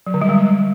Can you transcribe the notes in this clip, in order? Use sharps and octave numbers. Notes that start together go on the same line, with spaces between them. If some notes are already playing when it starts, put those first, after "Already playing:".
F#3
D3
G3
G#3